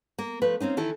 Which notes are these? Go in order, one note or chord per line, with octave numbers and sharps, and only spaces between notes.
A#3
F3 A3 B4
A#3 C4 C#4 D#4
D#3 E3 E4 A4